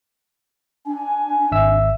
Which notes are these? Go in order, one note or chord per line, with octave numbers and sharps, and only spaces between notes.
D4 G#5
G#1 E5 E6